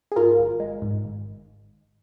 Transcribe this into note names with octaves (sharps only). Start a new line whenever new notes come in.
G#4
G#2 F4 A#4
G#1
G#3
G#2
G#1